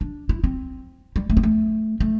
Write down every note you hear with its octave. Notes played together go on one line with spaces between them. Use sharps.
D4
E4
C4
G3
A3
C4
A3
A3